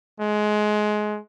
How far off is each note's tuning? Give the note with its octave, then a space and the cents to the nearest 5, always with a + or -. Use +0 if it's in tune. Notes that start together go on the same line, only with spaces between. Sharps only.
G#3 +20